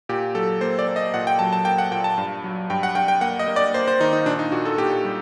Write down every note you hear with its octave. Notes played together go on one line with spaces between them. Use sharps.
A#2 G4
F#3 A4
A#3 C5
D5
A#3
D#5
A#2 F#5
G5
F#3 A5
A5
A#3 G5
F#5
A#2 G5
A5
G2
F#3
G2 G5
F#5
G2 G5
G5
A#3 F#5
D#5
A#3
D5
A#3 C5
C5
D#3 D#4
D#4
A#2 D4
D#4
A#2 F#4
A4
A#2 G4
G3